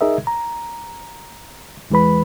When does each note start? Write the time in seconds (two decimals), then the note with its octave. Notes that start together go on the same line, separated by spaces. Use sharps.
0.01 D#4 G#4 A#4 D#5 E5
0.27 A#5
1.90 E2 E3 G#3 B4 B5